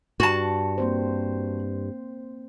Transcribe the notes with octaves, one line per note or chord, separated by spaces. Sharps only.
G2 F#4 A5
A#3 C4 C5